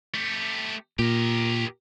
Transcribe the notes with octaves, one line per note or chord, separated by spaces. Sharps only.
A3 G4
A#2 G4 A#4